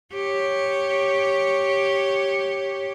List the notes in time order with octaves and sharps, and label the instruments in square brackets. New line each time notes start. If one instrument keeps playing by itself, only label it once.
[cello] G4 C#5